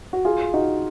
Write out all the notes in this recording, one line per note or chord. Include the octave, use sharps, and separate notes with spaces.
F#4
F4 G#4
D#4 F#4